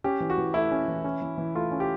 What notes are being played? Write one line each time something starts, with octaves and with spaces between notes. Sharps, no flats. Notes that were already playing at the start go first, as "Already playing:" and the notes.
C#4 G4
E3
F#4
E3
A3 E4
C#4
E3
C#4
E3
E3
A3 F4
C#4
G4